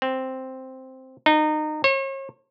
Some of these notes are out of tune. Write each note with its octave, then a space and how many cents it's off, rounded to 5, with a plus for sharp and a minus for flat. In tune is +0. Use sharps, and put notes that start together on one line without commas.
C4 +0
D#4 -25
C#5 -40